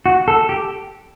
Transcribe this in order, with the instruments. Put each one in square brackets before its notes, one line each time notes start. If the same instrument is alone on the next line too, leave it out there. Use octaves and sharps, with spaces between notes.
[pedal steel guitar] F#4
A4
G4